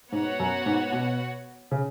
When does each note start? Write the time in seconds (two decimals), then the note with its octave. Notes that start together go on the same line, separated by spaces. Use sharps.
0.12 G#2 B3 F#4 C#5 F#5
0.40 F#2
0.66 G#2
0.92 B2
1.71 C#3